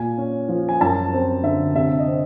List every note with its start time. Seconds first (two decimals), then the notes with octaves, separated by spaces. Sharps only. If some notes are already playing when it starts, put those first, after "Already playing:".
Already playing: A#2 G#5
0.18 C#4
0.49 F3
0.69 G#5
0.81 F#2 A5
1.13 C4
1.43 D3 E5
1.75 C3 E5
1.99 D#5
2.08 C4